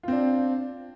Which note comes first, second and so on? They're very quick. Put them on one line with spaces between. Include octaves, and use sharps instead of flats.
F4 C4 D4